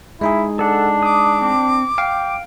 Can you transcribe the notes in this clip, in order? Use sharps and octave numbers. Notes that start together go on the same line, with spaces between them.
G#3 D#4 E4 G#4
D4 A4 F#5
D6 D#6
C4
F5 G5